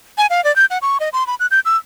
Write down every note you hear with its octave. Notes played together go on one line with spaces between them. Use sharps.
G#5
F5
D5
G6
F#5
C#6
D#5
C6
B5
F#6
G6
E6